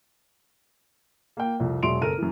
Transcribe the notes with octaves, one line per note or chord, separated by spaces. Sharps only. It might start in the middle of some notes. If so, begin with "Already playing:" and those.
A#3 G5
C2 F2
E1 F#3 E5 C6 D7 F7
F#1 A4 A#4 F6 D#7
F#2 E3